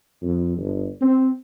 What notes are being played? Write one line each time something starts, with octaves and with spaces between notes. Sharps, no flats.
F2
G1
C4